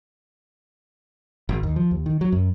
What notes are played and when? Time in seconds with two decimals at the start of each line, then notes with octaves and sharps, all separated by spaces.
1.49 G#1
1.63 D#2
1.76 F3
1.91 D#2
2.06 D#3
2.21 F#3
2.32 F#2